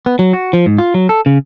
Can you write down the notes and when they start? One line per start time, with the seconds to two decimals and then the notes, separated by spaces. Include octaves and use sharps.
0.06 B3
0.19 F#3
0.33 F#4
0.53 F3
0.66 G#2
0.78 F4
0.94 F#3
1.09 A4
1.26 C#3